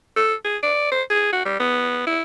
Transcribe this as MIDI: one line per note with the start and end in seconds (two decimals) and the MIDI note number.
0.16 0.34 69
0.44 0.57 68
0.63 0.87 74
0.91 1.03 72
1.10 1.30 68
1.32 1.42 66
1.45 1.59 55
1.60 2.06 59
2.07 2.22 64